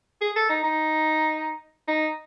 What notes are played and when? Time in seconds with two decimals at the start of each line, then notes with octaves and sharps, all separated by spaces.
0.21 G#4
0.36 A4
0.49 D#4
0.63 D#4
1.88 D#4